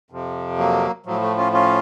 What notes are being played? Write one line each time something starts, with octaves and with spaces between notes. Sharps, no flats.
F2 C3 F3
F#3 A#3
A2 F3 F#3
A3
C#4 F4
C#4 F4